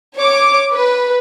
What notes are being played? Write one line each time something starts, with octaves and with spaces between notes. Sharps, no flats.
C#5 D6
B4